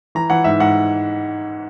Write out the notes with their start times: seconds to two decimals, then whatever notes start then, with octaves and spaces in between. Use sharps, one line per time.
0.15 E3 A#5
0.30 E3 F#5
0.44 G#2 E5
0.60 G#2 F#5